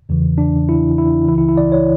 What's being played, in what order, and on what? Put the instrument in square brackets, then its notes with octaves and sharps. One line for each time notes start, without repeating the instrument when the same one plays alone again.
[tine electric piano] E2 C#3 E3
D4
E4
E4
C#2 C#3 E3 E4
E4
E4
D5
C#5